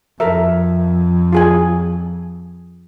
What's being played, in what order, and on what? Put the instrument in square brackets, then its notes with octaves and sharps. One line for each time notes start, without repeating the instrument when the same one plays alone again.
[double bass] F2 [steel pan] A4 A#4 E5
[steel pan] F4 G#4 G#5